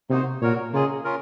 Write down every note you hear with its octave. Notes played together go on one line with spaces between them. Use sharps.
C3 A#3 D#4 F#4 C5
A#2 F#4 A#4 C#5
C#3 A#3 F4 G#4 D#5
C#4 F4 A#4